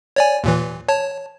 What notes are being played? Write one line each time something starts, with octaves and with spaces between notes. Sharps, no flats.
C#5 D5 G#5
D#2 A#2 E3
C#5 A5